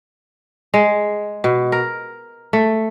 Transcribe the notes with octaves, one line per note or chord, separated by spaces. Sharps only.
G#3
B2
A#4
A3